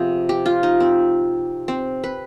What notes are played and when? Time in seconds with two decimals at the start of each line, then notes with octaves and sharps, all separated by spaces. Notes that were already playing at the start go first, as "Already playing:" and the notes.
Already playing: C3 F3 B3 G#4
0.29 G4
0.46 F4
0.63 D#4
0.80 C4
1.68 C4
2.04 B4